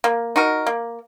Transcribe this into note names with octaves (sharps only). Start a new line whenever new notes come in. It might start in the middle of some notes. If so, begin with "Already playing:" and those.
A#3
D#4 F#4 A#4
A#3